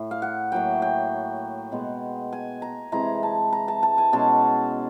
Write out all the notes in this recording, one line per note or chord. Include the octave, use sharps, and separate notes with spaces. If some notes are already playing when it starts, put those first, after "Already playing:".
Already playing: A2
F5
F#5
A2 F#3 A#3 G5
G5
B2 G#3 B3
G#5
A#5
C3 E3 G#3 A#5
A5
A#5
A5
A5
G#5
B2 G#3 C#4 A5